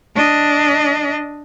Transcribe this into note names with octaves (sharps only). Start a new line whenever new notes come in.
D4 D#5